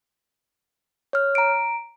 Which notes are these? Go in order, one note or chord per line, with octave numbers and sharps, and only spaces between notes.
C#5 F6
A#5 D7